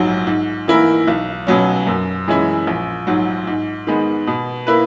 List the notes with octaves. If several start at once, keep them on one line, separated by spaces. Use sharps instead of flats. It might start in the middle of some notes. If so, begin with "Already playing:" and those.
Already playing: A#1 G#2 F#3
G#2
E3 A#3 E4 A#4
B1
B2 F#3 C#4
F#2
E3 G#3 C#4 E4
A#1
G#2 F#3
G#2
D#3 G#3 B3
B2
A#3 E4 B4